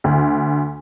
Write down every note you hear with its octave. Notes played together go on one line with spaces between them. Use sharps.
D2